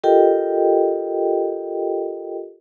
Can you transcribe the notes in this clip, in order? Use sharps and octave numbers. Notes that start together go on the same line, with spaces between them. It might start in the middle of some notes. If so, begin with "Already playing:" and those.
F4 G4 A4 A#4 D#5 G5